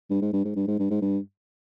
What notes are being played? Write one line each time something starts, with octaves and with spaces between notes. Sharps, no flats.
G2
G#2
G2
G#2
G2
G#2
G2
G#2
G2